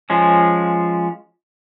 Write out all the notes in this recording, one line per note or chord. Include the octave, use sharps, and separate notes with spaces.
F3 G#3 C#4